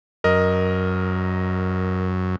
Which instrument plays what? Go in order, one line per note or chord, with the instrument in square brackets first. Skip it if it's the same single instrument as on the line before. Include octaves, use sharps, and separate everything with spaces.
[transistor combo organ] F#2 [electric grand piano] A#4 D#5